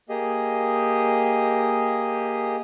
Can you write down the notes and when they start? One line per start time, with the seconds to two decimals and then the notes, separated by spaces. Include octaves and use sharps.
0.09 A#3 G4 G#4 D#5